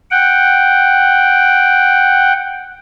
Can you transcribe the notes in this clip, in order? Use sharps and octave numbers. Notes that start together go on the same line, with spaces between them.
F#5 G5